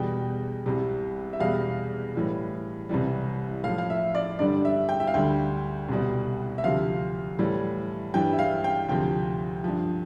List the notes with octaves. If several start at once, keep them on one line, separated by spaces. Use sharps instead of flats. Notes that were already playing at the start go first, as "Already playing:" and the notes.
Already playing: E2 B2 G3 G5
C2 C3 G3
E5
E2 B2 G3 F5
A2 E3 G3
C2 C3 E3 G3
A2 F3 F5
F5
E5
D5
G2 D3 G3 D5
E5
G5
E5
F5
D2 D3 G3 G5
C2 B2 G3
E5
D2 C3 F3 F5
A2 E3 G3
G2 E3 G3 G5
E5
F5
G5
D2 C3 F3 G5
G2 F3